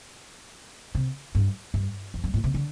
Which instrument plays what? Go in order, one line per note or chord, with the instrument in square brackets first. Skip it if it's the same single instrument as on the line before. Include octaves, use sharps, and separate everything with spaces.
[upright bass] C3
G2
G2
F2
G2
A2
C3
D3